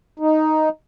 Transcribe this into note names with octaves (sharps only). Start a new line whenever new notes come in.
D#4